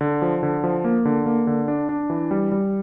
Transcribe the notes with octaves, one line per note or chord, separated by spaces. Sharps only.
D3
F3
D3
F3
A#3
D3
A#3
D3
D4
D4
E3
G3
G3